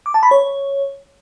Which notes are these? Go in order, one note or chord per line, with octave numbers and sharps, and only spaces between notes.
D6
A5
B5
C#5